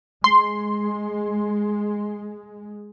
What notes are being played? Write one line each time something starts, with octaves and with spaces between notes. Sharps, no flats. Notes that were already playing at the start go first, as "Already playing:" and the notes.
G#3 C6